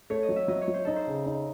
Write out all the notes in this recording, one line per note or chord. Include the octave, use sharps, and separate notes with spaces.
A3 C#5
D#5
F#3
E5
F#3 D#5
C#5
F#3
C5
D#4 A4
C5
C#3
D#4